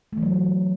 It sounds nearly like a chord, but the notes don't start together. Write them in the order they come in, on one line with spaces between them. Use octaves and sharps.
A3 E3 F#3